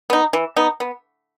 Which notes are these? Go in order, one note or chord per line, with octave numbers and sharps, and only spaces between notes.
B3 D#4
E3
B3 D#4
B3